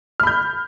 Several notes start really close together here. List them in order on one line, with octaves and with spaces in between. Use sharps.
F6 B5 G6